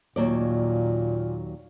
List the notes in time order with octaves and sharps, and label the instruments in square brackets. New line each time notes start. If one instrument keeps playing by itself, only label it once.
[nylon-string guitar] D#2 F#3 D5 [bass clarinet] A#2